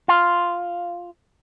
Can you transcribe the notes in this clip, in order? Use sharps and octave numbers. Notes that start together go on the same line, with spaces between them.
F4